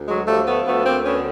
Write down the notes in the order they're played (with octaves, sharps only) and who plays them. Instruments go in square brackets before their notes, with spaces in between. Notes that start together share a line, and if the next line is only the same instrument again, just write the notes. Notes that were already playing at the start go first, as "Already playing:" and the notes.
Already playing: [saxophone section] D2
F#3 G#3
F3 G3 A3
A3 B3
D2 A3 B3
A#3 C4
D3 B3 C#4